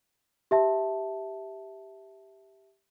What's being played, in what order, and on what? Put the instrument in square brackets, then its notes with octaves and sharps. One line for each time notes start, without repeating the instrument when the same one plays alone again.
[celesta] G4 E5 A5